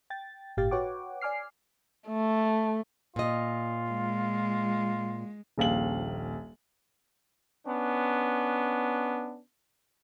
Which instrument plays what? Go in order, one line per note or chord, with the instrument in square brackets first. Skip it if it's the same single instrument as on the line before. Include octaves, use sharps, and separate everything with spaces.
[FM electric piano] G5 A6
G1 A2 G4 F5 G5 A6
F#4 B4 C#5 F#5 G5 D6
D5 G#5 D6 F6 C7
[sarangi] A3
[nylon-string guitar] A#2 D#5 [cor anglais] F4
[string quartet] G#3
[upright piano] D#1 A#1 F5 F#7
[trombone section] B3 C#4 D4